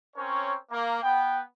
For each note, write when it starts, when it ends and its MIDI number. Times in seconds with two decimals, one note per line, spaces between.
0.16 0.54 60
0.16 0.54 61
0.16 0.54 70
0.16 0.54 73
0.70 0.98 58
1.02 1.40 59
1.02 1.40 79